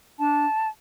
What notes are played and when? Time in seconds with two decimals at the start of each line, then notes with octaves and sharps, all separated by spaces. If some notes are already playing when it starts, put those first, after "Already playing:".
0.19 D4 A5